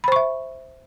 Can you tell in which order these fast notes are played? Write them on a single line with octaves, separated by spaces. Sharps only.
B5 C5 C#6 E5